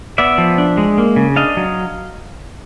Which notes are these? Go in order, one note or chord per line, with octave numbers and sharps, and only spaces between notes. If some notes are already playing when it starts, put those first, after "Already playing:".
B3 D5 E5
F3
D4
G#3
A#3
C#3
D4 D#5 F5
F#3